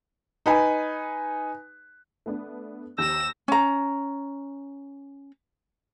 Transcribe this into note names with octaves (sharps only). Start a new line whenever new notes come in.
D#4 B4 G#5
A3 B3 D4
D#2 G4 E6 G6 A#6 E7
C#4 A#5